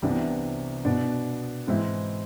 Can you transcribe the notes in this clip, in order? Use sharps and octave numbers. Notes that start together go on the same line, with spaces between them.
C2 C3 E3 B3 D4
B2 B3 D4
G#2 E3 G#3 C4 E4